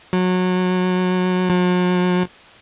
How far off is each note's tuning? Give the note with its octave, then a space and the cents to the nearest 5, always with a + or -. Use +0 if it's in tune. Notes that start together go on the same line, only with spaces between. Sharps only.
F#3 -20
F#3 -45